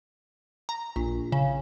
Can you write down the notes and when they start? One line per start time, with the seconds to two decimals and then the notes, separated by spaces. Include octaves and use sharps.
0.69 A#5
0.96 A#1
1.32 C#3